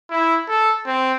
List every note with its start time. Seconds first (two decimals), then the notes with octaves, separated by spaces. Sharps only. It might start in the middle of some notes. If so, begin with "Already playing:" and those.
0.10 E4
0.48 A4
0.86 C4